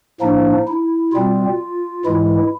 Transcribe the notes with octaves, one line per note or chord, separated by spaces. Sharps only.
A2 F3 A#3 D4 D#4
E4
B2 G3 C4 F4
G#2 E3 G#3 E4